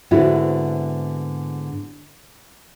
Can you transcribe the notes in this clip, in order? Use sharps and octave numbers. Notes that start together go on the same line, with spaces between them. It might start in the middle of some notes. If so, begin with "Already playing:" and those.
G#2 D3 B3 C4 E4 F#4